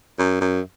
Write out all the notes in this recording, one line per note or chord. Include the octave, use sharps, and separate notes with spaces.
F#2
F#2